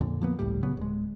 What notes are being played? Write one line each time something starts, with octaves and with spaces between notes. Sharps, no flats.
F2 A#2 D3
F3 A#3 B3
G1 C#2 A2 G3
A#2 C#3 F#3 B3
D1 G#3